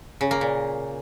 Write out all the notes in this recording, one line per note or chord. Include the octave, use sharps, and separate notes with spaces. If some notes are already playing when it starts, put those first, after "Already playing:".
C#3
A#3
A#2